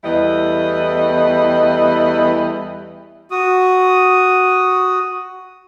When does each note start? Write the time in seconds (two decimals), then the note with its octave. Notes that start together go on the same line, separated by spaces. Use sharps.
0.04 E2 G3 A3 E4 B4 D#5
3.31 F#4 D#6